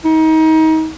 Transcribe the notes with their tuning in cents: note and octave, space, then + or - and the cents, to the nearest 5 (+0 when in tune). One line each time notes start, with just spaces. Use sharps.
D#4 +30